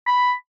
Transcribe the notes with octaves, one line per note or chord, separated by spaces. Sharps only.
B5